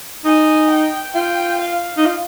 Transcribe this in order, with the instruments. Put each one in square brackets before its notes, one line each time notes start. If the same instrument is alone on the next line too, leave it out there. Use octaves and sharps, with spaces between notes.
[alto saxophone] D#4 [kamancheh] G#5
[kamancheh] G5
[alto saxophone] F4 [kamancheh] G5
[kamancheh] F5
[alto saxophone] D#4
F4